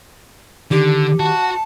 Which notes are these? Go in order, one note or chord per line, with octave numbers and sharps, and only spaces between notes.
D3 D#3 G4
F#4 A5